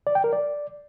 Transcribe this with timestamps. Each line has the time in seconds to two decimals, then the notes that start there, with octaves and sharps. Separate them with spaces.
0.07 D5
0.15 G5
0.24 A#4
0.33 D5